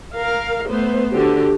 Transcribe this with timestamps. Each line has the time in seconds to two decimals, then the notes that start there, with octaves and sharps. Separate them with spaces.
0.14 A#4 F5
0.69 A3 B3 C5
1.14 D3 F#4 G4